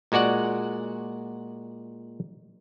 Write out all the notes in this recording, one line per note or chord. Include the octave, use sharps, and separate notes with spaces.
A#2 G#3 F#4 D5 F#5